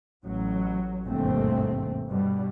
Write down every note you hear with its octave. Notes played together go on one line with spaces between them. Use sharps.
A1 F#3
G1 D#2 G#2 B2 A3 C4
G2 B2 G3